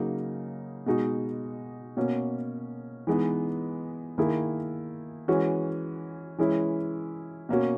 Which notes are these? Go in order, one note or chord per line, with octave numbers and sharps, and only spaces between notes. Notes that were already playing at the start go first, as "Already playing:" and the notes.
Already playing: C#3 F#3 A#3 D#4
B2 G#3 D#4 F#4
B2 A#3 C#4 F#4
E3 G#3 B3 D#4
D#3 A#3 E4 G#4
E3 G#3 C#4 F#4
E3 G#3 C#4 E4
B2 A#3 C#4 F#4